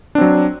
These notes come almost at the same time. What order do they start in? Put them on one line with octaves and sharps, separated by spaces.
D4 C4 F#3